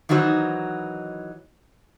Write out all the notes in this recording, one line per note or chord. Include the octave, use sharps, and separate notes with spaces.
D#3 E3 F#3 D#4 F#4 C5